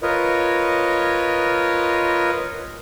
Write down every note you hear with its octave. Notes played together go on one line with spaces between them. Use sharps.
F4 A#4 B4 C#5 D#5